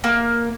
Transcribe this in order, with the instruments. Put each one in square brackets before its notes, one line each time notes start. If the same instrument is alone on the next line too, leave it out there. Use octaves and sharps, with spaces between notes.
[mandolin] A#3